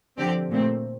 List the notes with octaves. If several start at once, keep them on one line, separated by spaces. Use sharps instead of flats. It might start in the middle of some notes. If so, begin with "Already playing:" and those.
D3 F3 C4 G4 D5
A#2 A3 C4